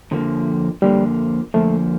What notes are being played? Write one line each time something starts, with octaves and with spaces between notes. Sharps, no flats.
F2 D3 F3 A#3
F2 D3 F3 G3 A#3
F2 D3 F3 A3 A#3